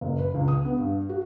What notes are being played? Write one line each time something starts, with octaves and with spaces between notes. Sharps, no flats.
F#1
B4
C#2
D#6
B3
G2
F#4